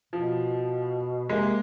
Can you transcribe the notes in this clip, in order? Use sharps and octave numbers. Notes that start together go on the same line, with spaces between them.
B2 F3
C3 G#3 A#3